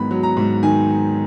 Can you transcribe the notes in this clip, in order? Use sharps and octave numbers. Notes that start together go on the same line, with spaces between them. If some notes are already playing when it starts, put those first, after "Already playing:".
Already playing: G#2 D#3 F#3 B3 B5
F#3
A#5
G#2
D#3 G#5